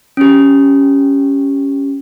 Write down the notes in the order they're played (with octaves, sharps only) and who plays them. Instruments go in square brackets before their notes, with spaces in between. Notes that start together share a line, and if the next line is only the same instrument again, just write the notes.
[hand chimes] C#4 G4